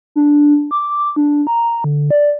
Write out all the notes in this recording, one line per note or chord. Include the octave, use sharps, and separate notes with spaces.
D4
D6
D4
A#5
D3
D5